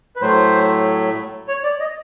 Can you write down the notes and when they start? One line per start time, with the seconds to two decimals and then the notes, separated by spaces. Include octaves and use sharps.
0.16 B4
0.21 A2 F#3 A3 C5
1.48 C#5
1.64 D5
1.80 D#5